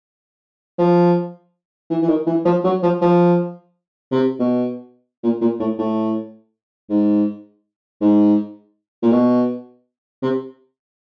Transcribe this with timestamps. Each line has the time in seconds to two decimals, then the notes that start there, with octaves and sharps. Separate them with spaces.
0.79 F3
1.90 E3
2.02 E3
2.09 D#3
2.27 E3
2.45 F3
2.64 F#3
2.83 F3
3.01 F3
4.12 C3
4.40 B2
5.23 A#2
5.41 A#2
5.59 A2
5.79 A2
6.90 G#2
8.01 G#2
9.02 A#2
9.12 B2
10.22 C3